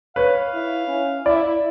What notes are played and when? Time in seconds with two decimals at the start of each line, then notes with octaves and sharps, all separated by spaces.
0.16 B4 C#5 F5
0.54 E4
0.88 C#4
1.26 E4 D5